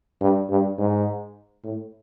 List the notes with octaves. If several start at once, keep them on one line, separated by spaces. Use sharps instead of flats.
G2
G2
G#2
A2